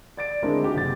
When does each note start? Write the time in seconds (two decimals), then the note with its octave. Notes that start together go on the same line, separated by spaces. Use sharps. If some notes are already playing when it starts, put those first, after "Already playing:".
0.17 D5 A6 D7
0.42 D3 G#3 C4 D4 E4 A#4
0.60 D#4 F#4 G4
0.74 F#1 C3 G4 A6